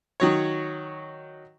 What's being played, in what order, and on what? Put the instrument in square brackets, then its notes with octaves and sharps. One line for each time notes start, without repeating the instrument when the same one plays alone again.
[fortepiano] D#3 F#3 C#5